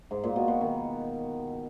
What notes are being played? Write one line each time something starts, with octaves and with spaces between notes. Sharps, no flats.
G#2
A#2
B2
B2
D#3